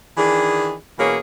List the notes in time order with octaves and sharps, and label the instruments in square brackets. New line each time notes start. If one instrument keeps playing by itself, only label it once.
[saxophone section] D#3 E3 D4 G#4
B2 E3 A#3 C#4 G#4 C#5